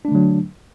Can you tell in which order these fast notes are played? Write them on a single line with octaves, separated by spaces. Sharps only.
D4 A3 D3 F#3